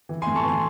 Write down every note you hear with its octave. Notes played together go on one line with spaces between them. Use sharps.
E3
G#5 C6
A2
A5 C#6
E3 G#5 C6